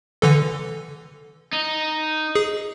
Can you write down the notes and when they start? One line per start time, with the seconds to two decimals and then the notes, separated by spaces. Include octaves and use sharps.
0.22 D3 E3 A4
1.53 D#4
2.35 G#4